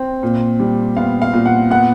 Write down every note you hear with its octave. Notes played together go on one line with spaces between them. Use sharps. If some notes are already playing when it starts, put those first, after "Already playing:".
Already playing: C4
A#2
G3
B3 F5
F5
A#2
F#5
B3 F#5